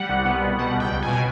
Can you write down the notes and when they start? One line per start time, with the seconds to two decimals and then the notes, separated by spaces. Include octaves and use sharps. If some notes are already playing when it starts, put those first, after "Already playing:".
Already playing: G3 F#5
0.09 C2
0.25 B3
0.42 B2
0.59 G3 F#5
0.75 C#2 G5
0.92 C#2
1.03 G#5
1.08 B2